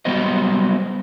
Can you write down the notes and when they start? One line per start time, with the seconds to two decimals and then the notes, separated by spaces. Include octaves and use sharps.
0.05 F#3 G3 B3 C5 D#5